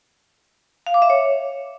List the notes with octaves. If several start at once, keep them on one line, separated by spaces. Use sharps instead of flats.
F5
D6
E5
C#5